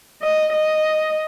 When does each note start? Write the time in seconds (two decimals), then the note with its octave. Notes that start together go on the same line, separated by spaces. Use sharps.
0.22 D#5
0.52 D#5